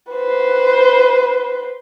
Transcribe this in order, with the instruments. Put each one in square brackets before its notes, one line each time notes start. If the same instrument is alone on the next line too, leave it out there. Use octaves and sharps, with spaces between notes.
[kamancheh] B4 C5